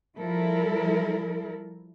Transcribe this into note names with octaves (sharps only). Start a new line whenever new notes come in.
F3 G3 E4 A4 A#4